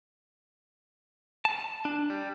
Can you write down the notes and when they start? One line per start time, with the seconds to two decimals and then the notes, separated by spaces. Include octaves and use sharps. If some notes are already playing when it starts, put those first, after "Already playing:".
1.45 A5
1.85 D4
2.10 G3